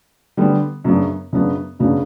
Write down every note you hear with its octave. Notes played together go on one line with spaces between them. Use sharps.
D3 G3 B3
F#2 C#3 F#3 B3 D4
F#2 C#3 F#3 B3 D4
F#2 C#3 F#3 B3 D4